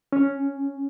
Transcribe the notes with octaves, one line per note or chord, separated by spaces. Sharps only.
C#4